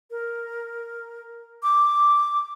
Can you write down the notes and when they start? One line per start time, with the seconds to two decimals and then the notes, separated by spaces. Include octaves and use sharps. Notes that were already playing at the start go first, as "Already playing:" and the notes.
0.11 A#4
1.63 D6